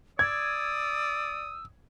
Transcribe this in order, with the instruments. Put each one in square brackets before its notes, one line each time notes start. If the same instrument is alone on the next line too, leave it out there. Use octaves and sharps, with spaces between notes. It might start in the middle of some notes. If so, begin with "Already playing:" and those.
[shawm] D5 [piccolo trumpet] D#6 [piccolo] E6 [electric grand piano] G#6